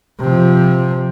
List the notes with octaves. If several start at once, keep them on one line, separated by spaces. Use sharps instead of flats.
C3 F3